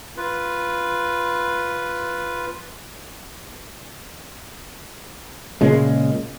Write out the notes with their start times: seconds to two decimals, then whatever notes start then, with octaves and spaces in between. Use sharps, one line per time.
0.17 F4 B4
5.61 A#2 C#3 G#3